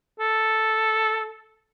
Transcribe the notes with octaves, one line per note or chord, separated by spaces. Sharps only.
A4